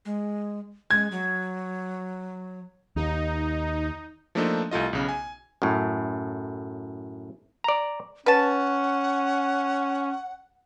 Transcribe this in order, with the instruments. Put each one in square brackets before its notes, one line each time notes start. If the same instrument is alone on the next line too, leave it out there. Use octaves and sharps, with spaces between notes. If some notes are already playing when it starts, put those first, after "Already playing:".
[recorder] G#3
[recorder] G#3 [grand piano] G#6
[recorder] F#3
[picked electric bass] D#2 [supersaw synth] D#4
[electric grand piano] F3 A3 A#3 D4 D#4 A4
C2 A3 F4 D#5
B1 C#3
G#5
[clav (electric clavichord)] F#2 A2
D5 A#5
[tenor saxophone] C#4 [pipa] B4 A5 [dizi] F#5